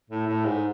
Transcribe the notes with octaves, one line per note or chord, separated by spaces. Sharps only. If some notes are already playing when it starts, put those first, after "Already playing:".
A2
A2
G#2